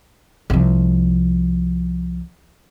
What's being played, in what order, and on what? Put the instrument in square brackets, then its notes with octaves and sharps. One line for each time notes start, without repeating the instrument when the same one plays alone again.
[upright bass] C2 F3